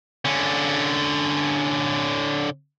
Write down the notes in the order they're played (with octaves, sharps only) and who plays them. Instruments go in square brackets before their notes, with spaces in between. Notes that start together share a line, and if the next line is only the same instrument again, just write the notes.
[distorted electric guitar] D3 C#4